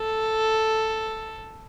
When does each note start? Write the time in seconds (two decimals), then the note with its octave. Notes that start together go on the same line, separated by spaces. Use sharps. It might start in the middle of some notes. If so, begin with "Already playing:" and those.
Already playing: A4